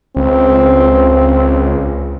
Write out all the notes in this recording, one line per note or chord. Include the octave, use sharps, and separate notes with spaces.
C#2 C4